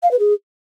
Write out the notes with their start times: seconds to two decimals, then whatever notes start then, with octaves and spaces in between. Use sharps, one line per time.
0.03 F5
0.11 B4
0.19 G#4